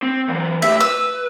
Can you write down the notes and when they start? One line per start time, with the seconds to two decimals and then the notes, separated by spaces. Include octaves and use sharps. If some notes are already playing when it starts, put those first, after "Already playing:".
0.03 C4
0.29 E3 F#3
0.62 A2 G4 E5
0.80 B4 E6